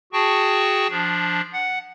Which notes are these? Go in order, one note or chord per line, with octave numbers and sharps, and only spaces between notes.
F#4 G#4 G5 A5 C#6
F3 D4
F#5